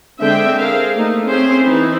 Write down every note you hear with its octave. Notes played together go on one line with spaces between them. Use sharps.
D3 G#3 C4 D4 E5 G5
G#4 A#4 C5 F5
A3 A#3 D#4
C4 C#4 G#4 C5 E5
E3 D#4 E4